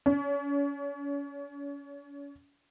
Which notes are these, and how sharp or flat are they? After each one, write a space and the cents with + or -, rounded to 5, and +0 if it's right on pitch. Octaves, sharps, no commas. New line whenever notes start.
C#4 +35